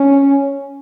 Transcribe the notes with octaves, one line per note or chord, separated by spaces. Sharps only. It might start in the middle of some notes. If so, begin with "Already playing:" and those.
Already playing: C#4